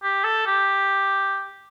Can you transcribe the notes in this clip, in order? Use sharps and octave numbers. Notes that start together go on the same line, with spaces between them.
G4
A4
G4